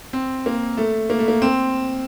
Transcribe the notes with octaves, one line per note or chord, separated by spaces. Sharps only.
C4
A#3
A3
A#3
A3
A#3
C4